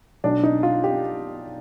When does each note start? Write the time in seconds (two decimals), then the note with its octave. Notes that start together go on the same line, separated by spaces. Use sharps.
0.24 B1 B2 D4
0.43 D#4
0.63 F4
0.84 G4